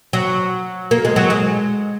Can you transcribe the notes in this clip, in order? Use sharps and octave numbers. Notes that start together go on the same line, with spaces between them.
F#3
A#3
G#3
F#3
G#3